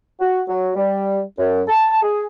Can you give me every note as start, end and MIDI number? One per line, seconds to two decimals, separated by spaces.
0.20 0.40 66
0.48 0.72 54
0.76 1.19 55
1.38 1.61 42
1.68 1.98 81
2.02 2.25 68